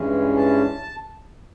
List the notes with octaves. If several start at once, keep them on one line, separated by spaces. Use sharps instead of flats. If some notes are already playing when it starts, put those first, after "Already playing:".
Already playing: G2 E3 G#3 C#4
A5